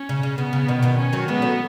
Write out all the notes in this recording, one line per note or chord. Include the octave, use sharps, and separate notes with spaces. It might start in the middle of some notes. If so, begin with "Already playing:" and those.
Already playing: C#4
C#3
C#3
C#3 B3
C#3
B2 D#3
B2 D#3
C#4
D#3 F#3
E3 G#3 B3
F#3 A3